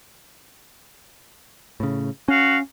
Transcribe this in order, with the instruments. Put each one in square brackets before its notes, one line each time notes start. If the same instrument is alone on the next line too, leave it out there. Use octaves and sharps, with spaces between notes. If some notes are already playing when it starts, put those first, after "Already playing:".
[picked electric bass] A2 C#3
[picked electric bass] C#4 [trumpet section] F#4 F5